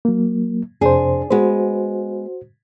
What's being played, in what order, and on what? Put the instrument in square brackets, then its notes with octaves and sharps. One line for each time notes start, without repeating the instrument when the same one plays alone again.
[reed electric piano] F#3 A#3
[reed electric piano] F2 C3 C5 [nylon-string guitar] D4 G#4
[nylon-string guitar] G#3 B3 [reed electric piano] F#4 C5